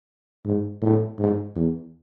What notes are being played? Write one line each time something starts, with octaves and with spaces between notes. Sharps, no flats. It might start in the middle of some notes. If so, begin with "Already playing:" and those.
G#2
A2
G#2
E2